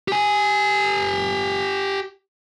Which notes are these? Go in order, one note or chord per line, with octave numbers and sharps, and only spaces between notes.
G4 G#5